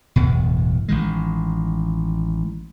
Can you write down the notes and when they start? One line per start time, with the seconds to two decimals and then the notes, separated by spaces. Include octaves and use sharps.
0.16 D1 G1 E2 B2
0.88 A1 D#3 G#3